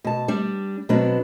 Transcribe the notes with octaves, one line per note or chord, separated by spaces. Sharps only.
B2 A5
G3 D4
B2 F#3 B3 C4 D4